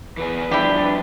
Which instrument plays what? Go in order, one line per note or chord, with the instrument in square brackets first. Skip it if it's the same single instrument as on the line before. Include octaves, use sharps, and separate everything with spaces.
[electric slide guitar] E3 B3 G#4 [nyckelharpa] B4
[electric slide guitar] D3 F3 G3 [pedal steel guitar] D4 [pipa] E4 G4